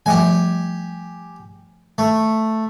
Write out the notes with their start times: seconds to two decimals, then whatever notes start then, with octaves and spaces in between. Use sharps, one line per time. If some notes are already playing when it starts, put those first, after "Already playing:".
0.06 F3 G3 A3 G4 G#5
1.98 A3